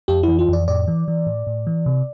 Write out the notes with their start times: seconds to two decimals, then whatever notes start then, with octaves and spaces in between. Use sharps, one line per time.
0.08 F2 G4
0.23 E3 E4
0.39 F4
0.49 F2 D5
0.68 A2 D5
0.88 E3
1.08 E3
1.27 A2
1.47 A2
1.67 E3
1.86 C3